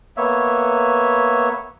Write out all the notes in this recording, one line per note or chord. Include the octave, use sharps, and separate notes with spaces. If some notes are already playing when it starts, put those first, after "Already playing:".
A#3 B3 C#5 E5